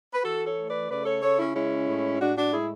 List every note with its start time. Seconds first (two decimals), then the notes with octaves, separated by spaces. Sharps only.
0.13 B4
0.24 E3 F#4 A4
0.45 A4 C#5
0.57 A3
0.68 B4 D5
0.89 C#3 B4 D5
1.05 A4 C#5
1.22 C#3 A4 C#5
1.38 C#4 E4
1.54 G#3 C#4 E4
1.87 A2
2.20 A2 D4 F#4
2.36 D4 F#4
2.52 G#3 E4 G#4